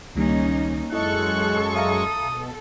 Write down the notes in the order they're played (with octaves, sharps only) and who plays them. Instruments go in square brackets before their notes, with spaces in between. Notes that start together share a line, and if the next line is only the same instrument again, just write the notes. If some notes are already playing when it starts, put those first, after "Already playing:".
[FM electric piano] C#2 D#3 G3 [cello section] A#3 C#4 D#4
[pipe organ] F#2 G#3 C#6 [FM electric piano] E4 D#5 [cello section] A4 [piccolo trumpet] F#6
[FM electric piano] E5 F5 A#5 [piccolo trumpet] D#6
[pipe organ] B2